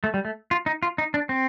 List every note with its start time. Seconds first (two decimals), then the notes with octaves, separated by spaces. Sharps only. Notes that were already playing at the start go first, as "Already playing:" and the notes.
0.04 A3
0.14 G3
0.25 A3
0.51 F4
0.66 D#4
0.83 F4
0.98 D#4
1.14 D4
1.29 C4